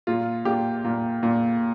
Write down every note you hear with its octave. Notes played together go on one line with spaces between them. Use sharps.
A#2 F4
A#2 G4
A#2
A#2